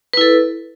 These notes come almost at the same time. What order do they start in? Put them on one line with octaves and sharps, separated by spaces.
B4 E4 A4